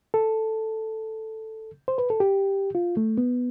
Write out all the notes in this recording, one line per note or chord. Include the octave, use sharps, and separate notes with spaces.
A4
C5
B4
A4
G4
F4
A3
B3